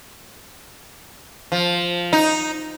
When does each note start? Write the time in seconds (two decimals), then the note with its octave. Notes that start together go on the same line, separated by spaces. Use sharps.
1.52 F3
2.13 D#4